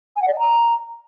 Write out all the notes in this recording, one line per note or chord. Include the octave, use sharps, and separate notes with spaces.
G#5
F#5
D5
D#5
A#5